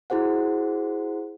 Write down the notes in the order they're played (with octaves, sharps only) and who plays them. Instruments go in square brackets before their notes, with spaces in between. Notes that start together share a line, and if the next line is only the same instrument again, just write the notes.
[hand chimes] E4 F#4 G#4 C5 F#5